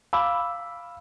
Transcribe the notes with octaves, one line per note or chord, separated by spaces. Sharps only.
F5 B5 D6 E6